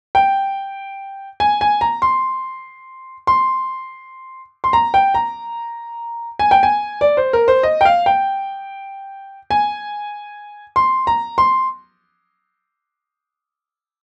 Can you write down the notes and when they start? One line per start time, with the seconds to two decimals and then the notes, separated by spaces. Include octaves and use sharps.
0.15 G5
1.40 G#5
1.61 G#5
1.81 A#5
2.02 C6
3.27 C6
4.64 C6
4.73 A#5
4.94 G5
5.14 A#5
6.39 G#5
6.51 G5
6.63 G#5
7.01 D5
7.17 C5
7.33 A#4
7.48 C5
7.63 D#5
7.81 G5
7.85 F5
8.06 G5
9.51 G#5
10.76 C6
11.07 A#5
11.38 C6